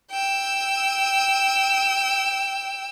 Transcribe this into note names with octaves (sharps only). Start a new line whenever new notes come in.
G5 E6